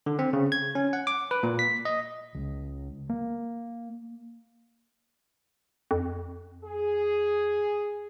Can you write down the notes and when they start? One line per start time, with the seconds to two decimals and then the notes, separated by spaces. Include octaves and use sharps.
0.06 D3
0.19 C4
0.33 C#3
0.52 G#6
0.75 C#4
0.93 F#5
1.07 D6
1.31 B4
1.43 A#2
1.59 B6
1.85 D#5
2.35 C#2
3.09 A#3
5.91 F2
6.64 G#4